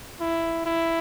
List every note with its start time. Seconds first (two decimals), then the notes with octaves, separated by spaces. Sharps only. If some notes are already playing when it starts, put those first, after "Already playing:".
0.21 E4
0.66 E4